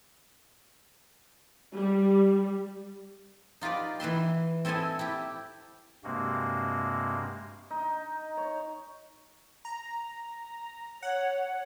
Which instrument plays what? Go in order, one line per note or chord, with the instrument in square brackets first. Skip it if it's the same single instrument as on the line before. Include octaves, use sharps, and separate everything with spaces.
[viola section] G3
[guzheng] D#4 F4 G4 B4 D5
E3 B4 E5 C6
C4 E4 A4 D#5 G#5
E4 G4
[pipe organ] G2 C3 G#3 A#3 C4 F#4
[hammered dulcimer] D#4
C#5
[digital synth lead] A#5
[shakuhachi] C#5 [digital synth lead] F#5